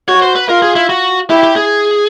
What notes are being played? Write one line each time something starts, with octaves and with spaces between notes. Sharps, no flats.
F#4 C#5
C5
B4
F4 A#4
G#4
E4
F#4
E4 G4
G4
G#4